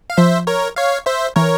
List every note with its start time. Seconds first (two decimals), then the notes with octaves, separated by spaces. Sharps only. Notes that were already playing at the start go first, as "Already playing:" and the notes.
0.10 F5
0.17 F3 C5 E5
0.47 A#4 C#5
0.76 C#5 F5
1.06 C5 E5
1.36 E3 A#4 C#5